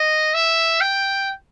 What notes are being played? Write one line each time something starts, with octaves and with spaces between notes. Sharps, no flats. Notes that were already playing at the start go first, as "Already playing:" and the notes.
Already playing: D#5
E5
G5